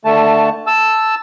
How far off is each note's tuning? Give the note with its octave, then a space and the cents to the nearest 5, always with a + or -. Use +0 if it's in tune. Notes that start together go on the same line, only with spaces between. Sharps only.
D3 +20 A3 +20 A5 +0
A5 +0 E6 +0